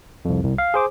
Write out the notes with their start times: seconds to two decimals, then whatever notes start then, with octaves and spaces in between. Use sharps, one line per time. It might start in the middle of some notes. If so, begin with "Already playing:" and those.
0.25 C2 F2
0.44 C2
0.58 F5
0.74 G#4 C5 D6